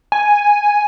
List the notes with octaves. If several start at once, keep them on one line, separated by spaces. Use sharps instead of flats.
G#5